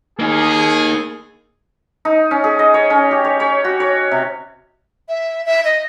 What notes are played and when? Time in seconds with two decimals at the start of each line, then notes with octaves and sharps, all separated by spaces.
0.19 A#3 D#4 G#4
2.05 D#4
2.31 C#4
2.44 G#4
2.59 D#5
2.74 C#5
2.90 C#4
3.11 G4
3.25 C#5
3.40 C#5
3.64 F#4
3.80 C#5
4.11 C3
5.09 E5
5.46 E5
5.65 D#5